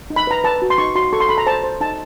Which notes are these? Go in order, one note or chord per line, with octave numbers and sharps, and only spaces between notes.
D#4
B5
B4 A#5
B4 A5
F#4
C6
D#4 C#6
F#4 C6
A4 C#6
C6
A4 B5
A#5
C5 A5
C5
D#4 A5